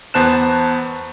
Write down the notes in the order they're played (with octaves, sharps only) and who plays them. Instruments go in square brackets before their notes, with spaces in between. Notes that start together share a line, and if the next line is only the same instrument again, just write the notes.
[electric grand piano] E2 B3 C5 A5 F#6 E7